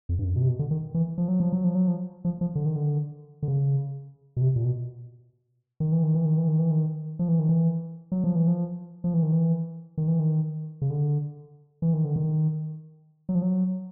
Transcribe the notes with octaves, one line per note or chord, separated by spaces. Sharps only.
F2
G2
F#2
B2
C3
B2
D3
D#3
E3
F3
F#3
F3
F#3
F3
F#3
F3
F3
F3
D3
D#3
D3
D3
C#3
B2
C3
A#2
B2
D#3
E3
D#3
E3
D#3
E3
D#3
E3
D#3
F3
E3
D#3
E3
F#3
F3
E3
F3
F3
E3
D#3
E3
D#3
E3
D#3
C#3
D3
E3
D#3
D3
D#3
F#3
F3
F#3